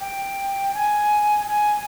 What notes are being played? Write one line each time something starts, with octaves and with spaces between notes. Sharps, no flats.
G5
G#5
G#5